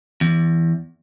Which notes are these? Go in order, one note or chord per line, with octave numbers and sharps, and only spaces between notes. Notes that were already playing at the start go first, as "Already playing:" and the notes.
E2